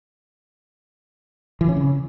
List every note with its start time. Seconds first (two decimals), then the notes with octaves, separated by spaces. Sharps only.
1.61 E3
1.69 C#4
1.77 C#3